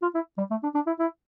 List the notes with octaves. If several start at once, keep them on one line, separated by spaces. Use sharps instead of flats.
F4
E4
G3
A3
D4
D4
E4
E4